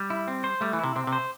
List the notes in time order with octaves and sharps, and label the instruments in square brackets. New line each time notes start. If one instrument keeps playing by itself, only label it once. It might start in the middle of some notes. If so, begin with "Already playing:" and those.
Already playing: [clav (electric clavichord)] G3
[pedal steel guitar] E4
C4
C5
[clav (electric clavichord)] G3 [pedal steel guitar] A3
[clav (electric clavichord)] E3
[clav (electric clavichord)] C3 [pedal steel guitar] E4
[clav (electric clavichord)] C3 [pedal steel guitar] C4
[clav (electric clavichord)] C3
[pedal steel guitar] C5